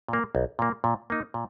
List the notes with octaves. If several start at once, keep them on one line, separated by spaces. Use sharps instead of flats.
A#2 A#3
B1
A#2 A#3
A#2
A#3 D#4
A#2